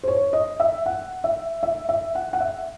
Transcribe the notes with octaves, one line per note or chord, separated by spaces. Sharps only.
C5
C#5
D#5
E5
F#5
E5
E5
E5
F#5
F#5
E5